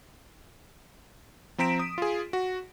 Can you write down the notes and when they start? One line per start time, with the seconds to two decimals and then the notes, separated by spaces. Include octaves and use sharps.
1.58 F3 C4 A#5 B6 D7 E7
1.79 D#6
1.98 F4 G#4
2.33 F#4